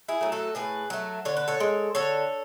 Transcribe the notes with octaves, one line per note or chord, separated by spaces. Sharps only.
E4 G#4
F#3 A3
F#4 A4
A2 G#4 B4
F#3 A3
D3 C#5
B4
A4 C#5
G#3
D3 A4 C#5